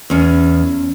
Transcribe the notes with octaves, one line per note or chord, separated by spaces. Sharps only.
E2 C#4